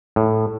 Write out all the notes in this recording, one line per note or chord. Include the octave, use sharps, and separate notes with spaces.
A2